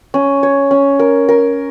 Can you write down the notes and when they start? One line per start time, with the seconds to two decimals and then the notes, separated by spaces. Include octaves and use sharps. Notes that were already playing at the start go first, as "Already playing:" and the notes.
0.14 C#4
0.43 C#5
0.71 C#4
0.99 A#4
1.28 A#4